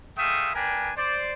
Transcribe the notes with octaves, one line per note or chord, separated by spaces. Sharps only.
G#3 A3 E5 F5 G5 D#6
D4 A#4 B4 G5 G#5
C5 D5